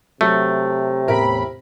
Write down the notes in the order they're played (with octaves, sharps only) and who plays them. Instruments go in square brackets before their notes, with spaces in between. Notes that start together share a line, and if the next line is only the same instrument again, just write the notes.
[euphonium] C3 [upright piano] F#3 [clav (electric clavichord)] A3
[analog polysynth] E2 A2 B5 [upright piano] E4 A#4